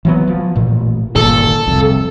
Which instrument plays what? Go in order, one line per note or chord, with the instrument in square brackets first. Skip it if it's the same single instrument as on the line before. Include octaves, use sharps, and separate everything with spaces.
[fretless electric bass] E3 F#3 B3
F3
A1 A#2
[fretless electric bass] G1 A#2 D#3 [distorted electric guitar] A4
[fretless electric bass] C2 F2